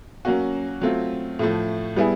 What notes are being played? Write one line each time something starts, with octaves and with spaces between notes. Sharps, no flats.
F#3 A#3 C#4 F#4
F#3 A3 C4 F4
A2 F3 A3
G3 B3 E4 G#4